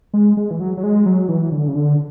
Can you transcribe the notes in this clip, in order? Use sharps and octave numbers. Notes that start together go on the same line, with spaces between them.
G#3
G#3
E3
F#3
F#3
G#3
F#3
E3
D3
C#3
D3